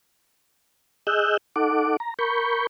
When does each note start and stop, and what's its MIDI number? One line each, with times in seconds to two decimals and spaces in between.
1.07 1.37 68
1.07 1.37 75
1.07 1.37 88
1.07 1.37 90
1.07 1.37 91
1.56 1.97 63
1.56 1.97 69
1.56 1.97 78
1.56 1.97 86
2.00 2.14 82
2.19 2.67 70
2.19 2.67 83
2.19 2.67 85
2.19 2.67 91